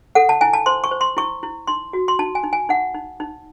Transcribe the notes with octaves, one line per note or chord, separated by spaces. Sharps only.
A4 F#5
A5
E4 G#5
A5
C5 C6
C#6
C5
C6
E4 C#6
E4
D#4 C6
F#4
C6
D#4 A5
G#5
D#4
G#5
D#4 F#5
D#4
D#4